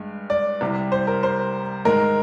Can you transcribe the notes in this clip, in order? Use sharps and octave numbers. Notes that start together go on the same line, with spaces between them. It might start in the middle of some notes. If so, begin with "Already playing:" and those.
Already playing: G2 G#3
D5
C2 C3 G3
C5
A#4
C5
G#2 D#3 G#3 A#4